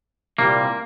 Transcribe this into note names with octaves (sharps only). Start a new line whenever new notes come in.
C2 A#2 G3 A#3